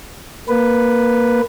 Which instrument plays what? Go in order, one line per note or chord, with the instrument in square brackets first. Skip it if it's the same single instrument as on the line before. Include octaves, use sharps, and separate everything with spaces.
[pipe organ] A#3 B4